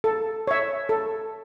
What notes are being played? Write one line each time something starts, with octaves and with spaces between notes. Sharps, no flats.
A4
C#5 E5
A4